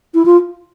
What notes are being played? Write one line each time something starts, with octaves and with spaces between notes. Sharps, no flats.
E4
F4